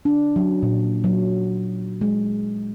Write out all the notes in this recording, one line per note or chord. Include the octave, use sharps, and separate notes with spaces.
D4
F#3
A#2
F#3
G#3